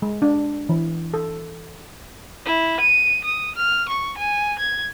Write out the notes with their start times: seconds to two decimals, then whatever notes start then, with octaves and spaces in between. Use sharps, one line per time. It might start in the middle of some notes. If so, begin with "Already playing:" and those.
0.02 G#3
0.22 D4
0.69 E3
1.14 A4
2.46 E4
2.80 D#7
3.24 D#6
3.56 F6
3.89 C#6
4.17 G#5
4.59 G#6